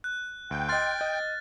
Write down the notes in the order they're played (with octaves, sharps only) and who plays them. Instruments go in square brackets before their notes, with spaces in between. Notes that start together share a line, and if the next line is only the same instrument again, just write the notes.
[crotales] F#6
[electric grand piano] D2 [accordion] G5
[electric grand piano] D#5 C6 [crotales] F6 A6
[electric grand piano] D#5